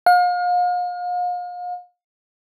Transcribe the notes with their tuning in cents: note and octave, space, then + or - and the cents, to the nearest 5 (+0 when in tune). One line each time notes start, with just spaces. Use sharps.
F5 +40